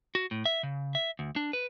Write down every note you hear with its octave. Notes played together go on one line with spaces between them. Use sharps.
F#4
A2
E5
C#3
E5
D2
D4
B4